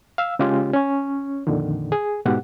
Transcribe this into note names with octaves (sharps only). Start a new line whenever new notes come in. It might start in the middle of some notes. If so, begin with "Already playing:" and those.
F5 E6
C#3 G#3 C#4 F4 G4
C#4 C#5
F2 A#2 D3 D#3
G#4
G#2 B2 G4 F#5